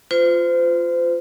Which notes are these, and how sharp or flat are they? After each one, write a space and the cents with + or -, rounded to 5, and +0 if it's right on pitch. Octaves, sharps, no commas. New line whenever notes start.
F4 +0 C5 -35